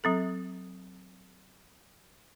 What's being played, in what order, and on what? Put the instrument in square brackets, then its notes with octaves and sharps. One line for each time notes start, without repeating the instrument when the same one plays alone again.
[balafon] F#3 C4 A4